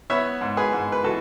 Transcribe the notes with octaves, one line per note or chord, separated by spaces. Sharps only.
B3 C#5 E5
G#2
G#4 B4
G#2
B4
E3 F#4 A4